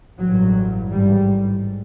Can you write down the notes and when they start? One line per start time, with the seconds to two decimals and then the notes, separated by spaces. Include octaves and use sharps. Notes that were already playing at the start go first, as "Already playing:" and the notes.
0.19 A1 G2 F#3
0.91 A1 G#2 G3